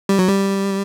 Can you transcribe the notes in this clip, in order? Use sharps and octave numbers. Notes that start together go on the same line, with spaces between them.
G3
F#3
G3